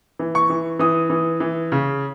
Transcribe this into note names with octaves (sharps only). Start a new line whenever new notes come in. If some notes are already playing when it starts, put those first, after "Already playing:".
E3
C#6
E3
E3 D#6
E3
E3
C#3